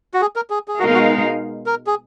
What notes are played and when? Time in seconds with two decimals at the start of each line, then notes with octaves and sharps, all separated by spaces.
0.14 F#4
0.21 G#4
0.36 A#4
0.50 G#4
0.68 G#4
0.79 B2 G#3 D#4 F#4 A#4 F5
0.94 F#4
1.66 A#4
1.87 G#4